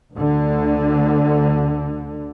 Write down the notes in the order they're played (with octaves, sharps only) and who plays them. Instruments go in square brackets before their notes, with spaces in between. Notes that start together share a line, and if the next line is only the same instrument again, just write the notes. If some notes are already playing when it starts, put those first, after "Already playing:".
[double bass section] D2 D3